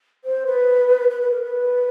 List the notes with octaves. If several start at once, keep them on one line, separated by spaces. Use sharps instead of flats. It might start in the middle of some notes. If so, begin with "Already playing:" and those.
C5
B4
B4
B4
A#4
B4